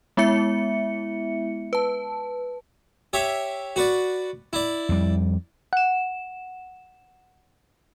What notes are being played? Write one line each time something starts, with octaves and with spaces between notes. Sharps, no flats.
G#3 B3 E4 E5 C#7
B4 A5
G4 C#5 E5
F#4 B4 D5
E4 D5
F2 G3
F#5 E7